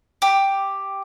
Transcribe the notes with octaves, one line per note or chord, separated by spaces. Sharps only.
G4